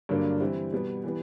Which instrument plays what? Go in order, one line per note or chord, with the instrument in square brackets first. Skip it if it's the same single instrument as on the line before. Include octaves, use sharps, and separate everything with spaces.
[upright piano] G2 D3 F#3 A#3 D4
E3 G3 C4 E4
B2 G3 B3
E3 G3 B3